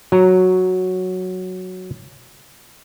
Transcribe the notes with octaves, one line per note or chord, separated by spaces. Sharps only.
F#3 A#5